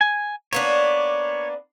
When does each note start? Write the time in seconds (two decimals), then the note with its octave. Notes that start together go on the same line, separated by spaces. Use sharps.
0.01 G#5
0.53 A#3 B3 D4 C#5